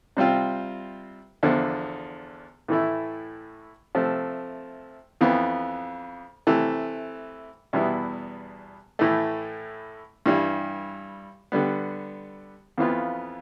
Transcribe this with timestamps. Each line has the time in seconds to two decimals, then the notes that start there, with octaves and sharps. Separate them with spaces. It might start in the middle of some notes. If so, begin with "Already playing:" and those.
0.17 C3 G3 C4 F4
1.43 E2 D3 F3
2.68 A2 E3 A3 E4
3.95 C3 F3 A3
5.21 F2 E3 B3
6.47 C3 E3 A3
7.73 E2 B2 G3 B3 E4
8.99 A2 E3 A3
10.26 G2 E3 G3
11.52 D3 G3 B3
12.78 F2 E3 B3 F4